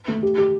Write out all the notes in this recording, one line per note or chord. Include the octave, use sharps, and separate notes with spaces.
A3
G4
G4